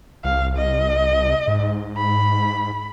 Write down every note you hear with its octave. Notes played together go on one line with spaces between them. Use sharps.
C2 F5
D#5
G#2
B5